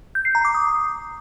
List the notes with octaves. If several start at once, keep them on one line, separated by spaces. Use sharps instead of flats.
G6
C7
A#5
D6
D#6